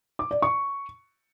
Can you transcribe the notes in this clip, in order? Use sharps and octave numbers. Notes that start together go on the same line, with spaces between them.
D6
D5
C#6